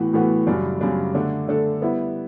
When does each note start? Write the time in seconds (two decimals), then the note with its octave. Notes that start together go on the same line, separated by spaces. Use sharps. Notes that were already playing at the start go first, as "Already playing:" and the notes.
Already playing: A2 E3 B3 F#4
0.13 A2 E3 B3 F#4
0.47 F#2 C#3 G3 D4
0.81 F#2 C#3 G3 D4
1.14 D3 A3 D4 A4
1.48 D3 A3 D4 A4
1.81 G3 B3 E4